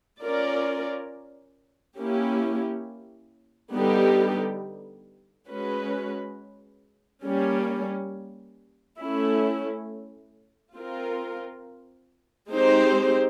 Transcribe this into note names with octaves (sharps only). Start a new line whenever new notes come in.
C#4 F4 A#4 D5
A#3 C#4 E4 G4
D3 G3 B3 D#4 G4
G#3 C#4 F#4 B4
G3 A#3 C#4
A3 C#4 E4
C4 F4 A#4
G#3 C4 D#4 G4 C5